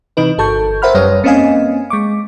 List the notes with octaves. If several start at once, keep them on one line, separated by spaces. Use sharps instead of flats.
C3 E3 D#4 B4
G1 A4 A5 C#6 G6
A#4 C5 E5 F#5 B5 F6
F#2 G3 B4 C#5 D#6 F6
A#3 C4 C#4 D#5 F5 G#5
G#3 C#6 D6